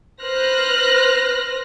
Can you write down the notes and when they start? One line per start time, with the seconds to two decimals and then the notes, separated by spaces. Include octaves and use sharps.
0.23 B4 C5 F6 F#6 A#6